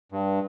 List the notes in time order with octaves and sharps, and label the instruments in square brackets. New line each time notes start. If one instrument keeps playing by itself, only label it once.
[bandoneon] G2